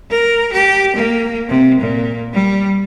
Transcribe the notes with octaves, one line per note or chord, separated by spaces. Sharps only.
A#4
G4
A#3
C3
A#2
G3